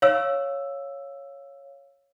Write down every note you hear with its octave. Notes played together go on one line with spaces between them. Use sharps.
C#5 F5 E6